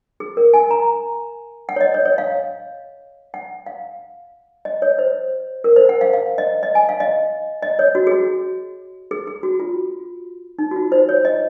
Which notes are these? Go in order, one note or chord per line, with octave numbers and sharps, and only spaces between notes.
G#4
A#4
G#5
A#5
F#5
C#5
D#5
C#5
C#5
F5
F#5
F5
D#5
C#5
C5
A#4
C5
F#5
F5
F5
D#5
D#5
G#5
F5
D#5
D#5
C#5
F#4
G#4
F#4
G#4
G#4
F#4
F4
D#4
F#4
F4
C5
C#5
D#5